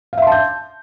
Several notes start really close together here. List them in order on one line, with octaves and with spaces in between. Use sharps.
F5 E5 C6 A5 G6